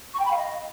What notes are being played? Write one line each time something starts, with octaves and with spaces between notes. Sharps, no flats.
C#6
G5
B5
F5
D#5